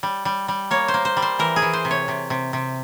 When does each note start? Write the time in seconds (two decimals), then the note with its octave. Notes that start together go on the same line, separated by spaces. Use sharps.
0.03 G3
0.25 G3
0.48 G3
0.71 A#3 C#5
0.88 C5
0.94 A#3
1.05 C5
1.17 G3
1.22 C5
1.39 E3 A#4
1.56 G#4
1.62 E3
1.73 C5
1.85 C3
1.91 C#5
2.08 C3
2.30 C3
2.53 C3